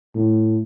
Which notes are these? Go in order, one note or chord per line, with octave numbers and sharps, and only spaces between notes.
A2